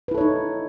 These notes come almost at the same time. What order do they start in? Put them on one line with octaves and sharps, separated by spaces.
B4 E4 A4 C#5 D#4